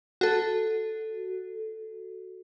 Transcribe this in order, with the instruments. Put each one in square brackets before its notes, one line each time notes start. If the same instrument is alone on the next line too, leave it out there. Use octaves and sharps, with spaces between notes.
[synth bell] F#4 A4